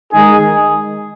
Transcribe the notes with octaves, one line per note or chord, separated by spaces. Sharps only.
D#3 G#3 D#4 G#4